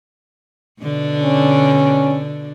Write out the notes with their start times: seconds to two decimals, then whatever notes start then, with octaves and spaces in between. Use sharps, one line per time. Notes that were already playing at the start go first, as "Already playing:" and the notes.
0.82 B2 D3 D4
1.22 C#4